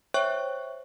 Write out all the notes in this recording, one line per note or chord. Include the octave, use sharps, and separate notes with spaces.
C5 C#5 E5 G5 C#6 F#6